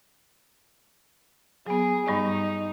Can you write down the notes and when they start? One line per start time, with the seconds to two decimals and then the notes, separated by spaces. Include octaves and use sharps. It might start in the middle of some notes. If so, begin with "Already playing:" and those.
1.67 F#3 B3 G#4
2.08 G2 G3 D#4 C#6